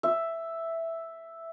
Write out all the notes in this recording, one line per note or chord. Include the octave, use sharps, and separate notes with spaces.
E5